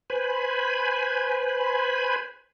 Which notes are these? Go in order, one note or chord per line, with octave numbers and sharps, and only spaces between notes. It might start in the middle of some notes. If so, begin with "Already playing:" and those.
B4 C5 G#5 B5